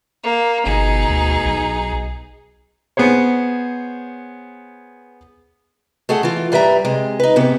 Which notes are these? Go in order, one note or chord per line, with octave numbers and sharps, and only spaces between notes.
A#3
G1 B2 D#4 G#4
D2
B1
B3 G#4 C5 C#5
A3 G#4 A4 F#5
E3 F4
G2 G3 B4 E5 A#5
C3 G#3
D#4 B4
G#2 C3 B3